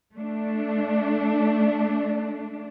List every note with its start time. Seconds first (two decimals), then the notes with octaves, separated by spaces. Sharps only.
0.14 A3 D4